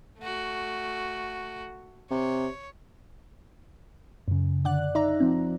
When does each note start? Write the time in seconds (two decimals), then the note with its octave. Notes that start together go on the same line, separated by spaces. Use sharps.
0.19 A3 F#4
2.11 C3 C#5
4.28 F#2 C#3
4.65 D3 D5 F#5 F#6
4.95 D#4 D5 E5 A#5
5.20 F3 C4